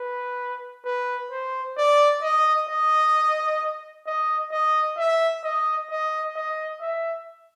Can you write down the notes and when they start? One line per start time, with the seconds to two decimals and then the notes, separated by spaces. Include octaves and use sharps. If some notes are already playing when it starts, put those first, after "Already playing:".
Already playing: B4
0.85 B4
1.31 C5
1.78 D5
2.22 D#5
2.68 D#5
4.07 D#5
4.52 D#5
4.98 E5
5.44 D#5
5.91 D#5
6.36 D#5
6.81 E5